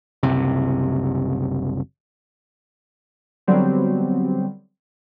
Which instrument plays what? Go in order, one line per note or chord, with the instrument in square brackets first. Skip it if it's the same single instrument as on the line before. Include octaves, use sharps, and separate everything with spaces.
[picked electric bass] F#1 C2 C3
[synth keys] D3 F#3 G3 B3 C4